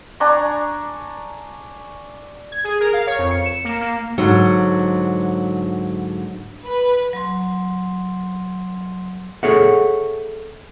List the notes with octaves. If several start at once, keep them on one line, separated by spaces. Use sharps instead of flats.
D4 G#5 A#5 C#6
G#6
G#4
A#4
F5
C#5
F2
C#7
E7
A#3
A#3
G#2 D3 F#3
B4
F#3 C6
G#4 A4 C#5 E5 F#5